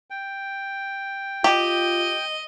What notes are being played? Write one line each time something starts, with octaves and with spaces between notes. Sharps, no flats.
G5
F4 G4 D#5